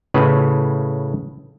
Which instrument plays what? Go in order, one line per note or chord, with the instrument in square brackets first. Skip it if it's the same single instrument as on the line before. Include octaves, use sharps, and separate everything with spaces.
[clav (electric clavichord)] A2 C#3 B4